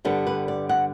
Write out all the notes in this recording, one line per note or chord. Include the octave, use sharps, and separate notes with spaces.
G2 D3 G3 B3 D4
B4
D5
F#5